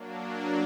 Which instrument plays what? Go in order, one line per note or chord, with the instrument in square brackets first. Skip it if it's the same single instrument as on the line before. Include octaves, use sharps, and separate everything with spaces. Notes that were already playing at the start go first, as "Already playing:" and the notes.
Already playing: [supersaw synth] F#3 A#3 D4